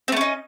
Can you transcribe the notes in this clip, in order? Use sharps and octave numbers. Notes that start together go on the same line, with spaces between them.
A3 C4 C#4 D#4